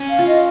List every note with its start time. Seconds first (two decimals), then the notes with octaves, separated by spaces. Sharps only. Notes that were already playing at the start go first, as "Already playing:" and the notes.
Already playing: C#4
0.09 F5
0.19 F4
0.27 D#5